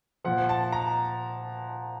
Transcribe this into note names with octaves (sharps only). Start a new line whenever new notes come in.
A#2 F3 F#5
A5
A#5